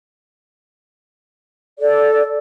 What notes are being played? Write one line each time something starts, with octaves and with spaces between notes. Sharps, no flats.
A4 D5